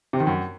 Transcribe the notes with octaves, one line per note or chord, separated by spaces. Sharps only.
C3
D#3
F#2